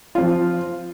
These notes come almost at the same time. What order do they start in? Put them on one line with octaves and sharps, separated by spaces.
F4 C4 F3